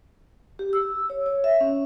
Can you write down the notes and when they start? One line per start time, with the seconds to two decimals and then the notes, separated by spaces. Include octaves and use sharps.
0.59 G4
0.73 E6
1.10 C#5
1.26 C#5
1.44 E5
1.61 C#4